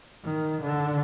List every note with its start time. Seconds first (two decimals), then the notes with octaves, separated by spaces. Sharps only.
0.24 D#3
0.62 D3